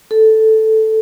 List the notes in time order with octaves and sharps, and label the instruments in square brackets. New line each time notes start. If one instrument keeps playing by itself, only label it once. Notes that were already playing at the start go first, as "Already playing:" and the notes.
[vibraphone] A4